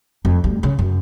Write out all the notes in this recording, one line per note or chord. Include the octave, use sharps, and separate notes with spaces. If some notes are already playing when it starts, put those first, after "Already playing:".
F2
D2 G3
C#3
F#2